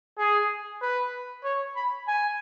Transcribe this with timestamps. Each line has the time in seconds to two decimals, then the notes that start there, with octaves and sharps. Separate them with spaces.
0.18 G#4
0.82 B4
1.44 C#5
1.76 B5
2.08 G#5